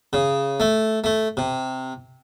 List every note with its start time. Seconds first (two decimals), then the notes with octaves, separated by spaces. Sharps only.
0.13 C#3
0.60 A3
1.04 A3
1.37 C3